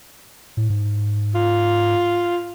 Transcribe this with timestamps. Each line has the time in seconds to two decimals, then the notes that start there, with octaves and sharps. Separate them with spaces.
0.57 A2
0.70 G#2
1.35 F4